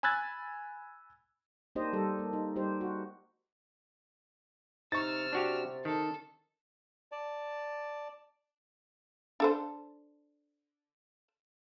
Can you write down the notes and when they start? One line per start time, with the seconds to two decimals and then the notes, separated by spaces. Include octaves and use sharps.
0.03 G#5 B5 E6 F#6 G#6 A6
1.75 A#3 D4 D#4 G4 C5 D#5
1.93 G3 A4
2.19 A#3
2.33 D#4
2.56 G3 D#4 G4 C5
2.81 F#4
4.92 C3 D#4 C#6 E6 F6 A6
5.33 D4 F#4 G4
5.85 D#3 A4
7.12 D5 A5
9.40 D4 A4 C5